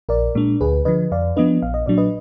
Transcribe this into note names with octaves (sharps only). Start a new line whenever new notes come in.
A#1 A#4 D5
A#2 G#3 D4
D2 G#4 B4
D3 F3 B4 D#5
F2 D5 F5
F3 B3 D4 B4 D#5
A#1 F5
D#5
A#2 F#3 D4 D5
B4 D#5